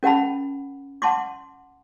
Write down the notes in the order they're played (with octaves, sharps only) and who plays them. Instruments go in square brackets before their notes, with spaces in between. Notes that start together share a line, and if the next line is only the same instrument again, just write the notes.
[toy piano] C#4 A#4 F#5 A5 B5
F#5 A5 C6 D6